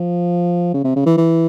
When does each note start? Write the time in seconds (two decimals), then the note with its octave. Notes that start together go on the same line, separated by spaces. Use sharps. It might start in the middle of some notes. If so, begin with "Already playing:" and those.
Already playing: F3
0.74 C#3
0.84 C3
0.96 C#3
1.06 E3
1.17 E3